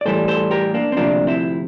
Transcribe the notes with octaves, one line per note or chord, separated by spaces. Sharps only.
D5
A2 E3 G3 A4 C5
A4 C5
G4 A#4
A#3 D4
C4
D2 C3 F3 A#3 D4
C4 E4